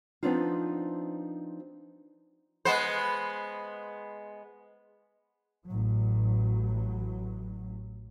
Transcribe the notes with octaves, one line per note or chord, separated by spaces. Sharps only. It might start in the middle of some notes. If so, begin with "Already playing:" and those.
F3 B3 C4 D4 D#4 F4
G#3 B3 C5
A1 F#3